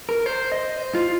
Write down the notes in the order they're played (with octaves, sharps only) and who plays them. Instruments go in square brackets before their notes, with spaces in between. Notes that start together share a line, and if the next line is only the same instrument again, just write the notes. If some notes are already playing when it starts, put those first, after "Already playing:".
[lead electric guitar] A#4
C5
D#5
C5
F4